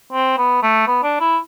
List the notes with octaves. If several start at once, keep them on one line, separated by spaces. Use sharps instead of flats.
C4
B3
A3
B3
D4
E4